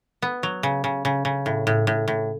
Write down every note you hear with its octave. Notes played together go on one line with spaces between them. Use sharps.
B3
F#3
C#3
C#3
C#3
C#3
A2
A2
A2
A2